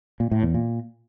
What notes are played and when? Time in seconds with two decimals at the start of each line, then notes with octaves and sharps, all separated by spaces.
0.20 A#2
0.31 A2
0.43 E2
0.55 A#2